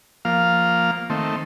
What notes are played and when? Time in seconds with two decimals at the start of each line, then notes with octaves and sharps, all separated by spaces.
0.25 F3 A#3 F5
1.10 D#3 A3 C4